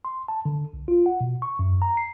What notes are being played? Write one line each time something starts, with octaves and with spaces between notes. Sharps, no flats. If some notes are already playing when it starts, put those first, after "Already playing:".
C6
A5
D3
C2
F4
F#5
B2
C#6
F#2
A#5
C7